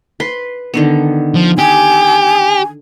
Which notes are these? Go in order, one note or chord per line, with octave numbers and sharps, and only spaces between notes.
B4 C6
D3 D#3 B3
F3
G4 G#5